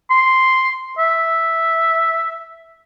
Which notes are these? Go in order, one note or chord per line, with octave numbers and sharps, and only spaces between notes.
C6
E5